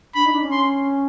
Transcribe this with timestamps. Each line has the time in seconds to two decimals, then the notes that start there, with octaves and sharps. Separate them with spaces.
0.15 D4 B5
0.24 D#4
0.33 D4
0.42 C#4
0.51 C6